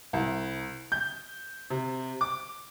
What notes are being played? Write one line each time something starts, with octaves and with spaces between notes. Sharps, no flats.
C2
G6
C3
D6